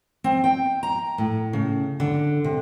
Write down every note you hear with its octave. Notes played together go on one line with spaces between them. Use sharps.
C4
G5
A#5
A2
C#3
D3
C3